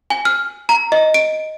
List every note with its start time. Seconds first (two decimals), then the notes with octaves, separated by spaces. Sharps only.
0.10 G#5
0.25 F6
0.69 A#5
0.92 D#5
1.14 D7